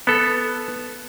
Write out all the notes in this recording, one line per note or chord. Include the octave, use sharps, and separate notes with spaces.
B3 A4